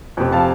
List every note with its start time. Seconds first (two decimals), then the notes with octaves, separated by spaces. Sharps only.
0.17 F2 C3 F3
0.32 F5 A5